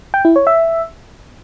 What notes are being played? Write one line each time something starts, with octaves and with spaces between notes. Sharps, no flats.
G5
E4
C#5
E5